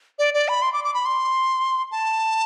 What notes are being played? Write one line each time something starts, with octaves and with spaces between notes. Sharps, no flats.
D5
D5
B5
C6
D6
D6
B5
C6
A5